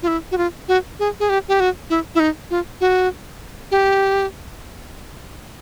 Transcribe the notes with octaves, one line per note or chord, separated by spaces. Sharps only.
F4
E4
F#4
F4
F#4
G#4
G#4
G4
G4
F#4
E4
E4
D#4
F4
F#4
G4